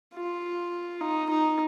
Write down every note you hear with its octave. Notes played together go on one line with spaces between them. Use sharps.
F4
D#4
D#4